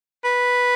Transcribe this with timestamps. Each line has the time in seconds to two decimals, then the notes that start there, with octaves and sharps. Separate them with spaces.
0.25 B4